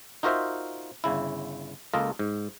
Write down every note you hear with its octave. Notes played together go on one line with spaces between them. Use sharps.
D#4 F4 F#4 A#4 C5 E5
G1 C#3 E4
C#2 A#3 F4 A4 D#5
G#2